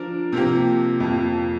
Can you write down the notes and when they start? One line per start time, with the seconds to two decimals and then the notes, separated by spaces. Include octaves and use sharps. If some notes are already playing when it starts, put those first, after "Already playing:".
Already playing: F3 D4 A#4
0.32 C3 F3 A#3 G4
1.00 F2 F3 A#3